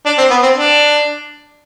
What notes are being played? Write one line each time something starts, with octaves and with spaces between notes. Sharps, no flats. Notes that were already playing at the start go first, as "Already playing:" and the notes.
D4
C4
B3
C4
D4